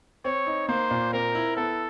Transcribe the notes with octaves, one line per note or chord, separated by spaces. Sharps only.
C4 C#5
D#4
A#3 C5
A#2
C4 A#4
E4
B3 A4